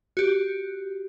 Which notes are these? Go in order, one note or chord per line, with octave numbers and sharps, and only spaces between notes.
F#4 G4